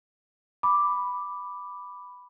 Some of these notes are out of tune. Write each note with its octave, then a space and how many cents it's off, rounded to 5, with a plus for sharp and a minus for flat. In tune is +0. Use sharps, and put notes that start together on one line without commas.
B5 +0 D6 +0